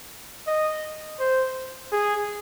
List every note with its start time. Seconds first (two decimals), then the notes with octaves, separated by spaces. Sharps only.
0.47 D#5
1.19 C5
1.92 G#4